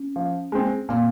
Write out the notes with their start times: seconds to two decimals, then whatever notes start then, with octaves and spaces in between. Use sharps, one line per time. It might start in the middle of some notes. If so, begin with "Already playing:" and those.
Already playing: C#4
0.16 F3
0.52 G#3 C4
0.89 A#2 C4